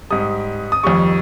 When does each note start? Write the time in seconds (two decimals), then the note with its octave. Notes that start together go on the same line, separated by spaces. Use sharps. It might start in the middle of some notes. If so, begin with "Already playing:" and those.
0.10 G#2 G3 D#6
0.72 D#6
0.83 F2 D#3 G3 C#6